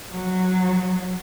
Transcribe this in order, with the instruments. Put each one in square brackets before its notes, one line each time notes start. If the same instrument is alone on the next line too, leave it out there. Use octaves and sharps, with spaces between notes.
[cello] F#3